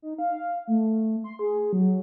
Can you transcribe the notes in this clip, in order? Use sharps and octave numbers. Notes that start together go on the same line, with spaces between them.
D#4
F5
A3
C6
G#4
F#3